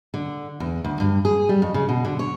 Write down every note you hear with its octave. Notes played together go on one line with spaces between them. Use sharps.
D3
E2
D2
G2
G#4
G3
F2
C#3
B2
D3
C#5